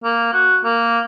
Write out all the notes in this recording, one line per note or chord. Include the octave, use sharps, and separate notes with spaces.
A#3
F#4
A#3